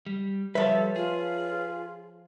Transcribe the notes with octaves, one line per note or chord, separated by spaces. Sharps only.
G3
F3 G3 A4 B4 C#5 E5 A5
F4 G#4